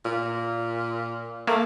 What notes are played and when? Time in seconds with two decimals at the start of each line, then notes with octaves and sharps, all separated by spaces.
0.05 A#2
1.47 A3 A#3